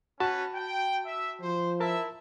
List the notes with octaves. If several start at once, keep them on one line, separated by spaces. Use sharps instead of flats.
C#4 F#4 B4 A5 B5
G5
E5
F3 C5
E4 A#4 E5 A5